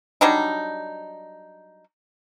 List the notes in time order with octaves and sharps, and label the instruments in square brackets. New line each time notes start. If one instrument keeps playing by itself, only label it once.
[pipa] F#3 G3 D4 D#4